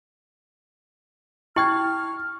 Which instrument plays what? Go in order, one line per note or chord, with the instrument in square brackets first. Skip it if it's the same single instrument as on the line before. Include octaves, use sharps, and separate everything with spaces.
[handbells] E4 G5 G#6 [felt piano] C#6 [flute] F6